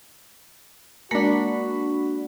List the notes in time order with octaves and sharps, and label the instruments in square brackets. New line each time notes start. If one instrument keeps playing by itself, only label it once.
[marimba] G#3 A#3 A#4 [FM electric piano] D4 B5 [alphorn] F#4